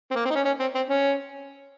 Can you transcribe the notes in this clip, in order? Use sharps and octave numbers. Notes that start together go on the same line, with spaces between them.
C4
A#3
C4
D#4
C#4
C#4
C4
C4
C#4